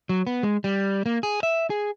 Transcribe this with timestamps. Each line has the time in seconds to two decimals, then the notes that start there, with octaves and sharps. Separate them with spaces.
0.09 F#3
0.27 B3
0.43 G#3
0.64 G3
1.06 A#3
1.23 G#4
1.43 E5
1.70 G#4